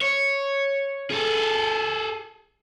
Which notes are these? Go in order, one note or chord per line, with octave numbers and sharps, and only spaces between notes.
C#5
G#4 A4